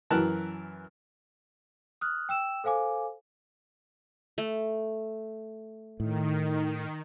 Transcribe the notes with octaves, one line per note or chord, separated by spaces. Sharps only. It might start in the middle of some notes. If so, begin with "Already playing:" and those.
F#2 E3 A#4 A5 F#6
D#6 F6 F#6
G5 E6 E7
A4 C5 F5 G#5 D6
A3
A2 D#3